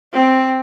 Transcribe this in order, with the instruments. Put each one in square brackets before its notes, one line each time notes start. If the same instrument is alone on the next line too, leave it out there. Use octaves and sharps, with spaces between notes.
[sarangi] C4